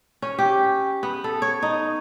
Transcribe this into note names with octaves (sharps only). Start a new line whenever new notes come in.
C#4
G4
B3
A4
C#5
D#4